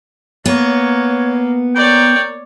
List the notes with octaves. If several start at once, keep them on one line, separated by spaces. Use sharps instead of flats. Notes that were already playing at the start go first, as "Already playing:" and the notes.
A#3 B3 C#5
A#4 C#5 D5 G5